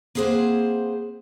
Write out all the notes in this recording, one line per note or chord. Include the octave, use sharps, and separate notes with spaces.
A#3 C4 G#4 B4 C5 F#5